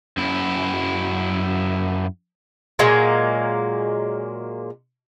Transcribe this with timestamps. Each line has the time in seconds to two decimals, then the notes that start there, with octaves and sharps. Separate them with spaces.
0.17 F#2 E4
2.79 A#2 F#3 G#3 A#3